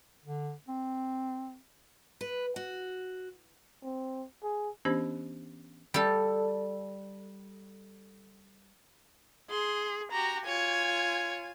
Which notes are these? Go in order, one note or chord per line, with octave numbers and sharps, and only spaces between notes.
D3
C4
B4
F#4
C4
G#4
E3 B3 C#4 D4 G4 C5
G3 A4
G#4 C6
F#4 G4 A#5
F4 C#5 G#5